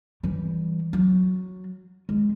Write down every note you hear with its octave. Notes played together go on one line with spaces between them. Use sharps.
E3 G3
F#3
G#3